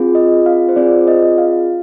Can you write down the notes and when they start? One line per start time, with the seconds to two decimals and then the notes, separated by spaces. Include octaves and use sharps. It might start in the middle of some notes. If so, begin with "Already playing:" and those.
Already playing: C4 F4 G#4
0.15 D#5
0.46 F5
0.69 C5
0.76 C4 F4 G#4 D5
1.08 D#5
1.38 F5